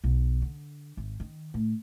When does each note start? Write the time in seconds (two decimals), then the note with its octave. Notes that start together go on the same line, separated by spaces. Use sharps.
0.04 B1
0.42 D3
0.97 G#1
1.20 D#3
1.54 A2